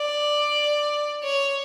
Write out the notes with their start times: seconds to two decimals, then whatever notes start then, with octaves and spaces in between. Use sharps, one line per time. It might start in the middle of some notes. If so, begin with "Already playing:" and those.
Already playing: D5
1.23 C#5